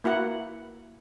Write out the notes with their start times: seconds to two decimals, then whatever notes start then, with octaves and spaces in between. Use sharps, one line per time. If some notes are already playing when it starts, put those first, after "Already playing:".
0.04 A#3 E4 F#4 F#5